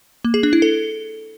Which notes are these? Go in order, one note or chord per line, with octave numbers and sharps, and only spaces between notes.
A#3
G#4
D4
E4
A4